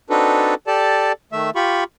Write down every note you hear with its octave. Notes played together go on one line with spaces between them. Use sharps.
C4 D4 D#4 F#4 A4 B4
G4 A4 D5 A5
D#3 A3 E5
F4 G4 B5 C#6